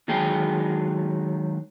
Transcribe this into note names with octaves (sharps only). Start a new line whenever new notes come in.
D#3 F#3 G#3 G#4 G5